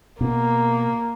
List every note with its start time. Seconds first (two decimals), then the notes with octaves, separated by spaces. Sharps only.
0.21 B2 A#3